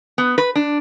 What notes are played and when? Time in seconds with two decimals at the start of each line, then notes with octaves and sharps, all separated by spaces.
0.18 B3
0.38 B4
0.55 D4